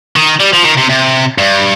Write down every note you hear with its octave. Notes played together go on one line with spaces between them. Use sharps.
D#3
G3
F3
D#3
C3
C3
G2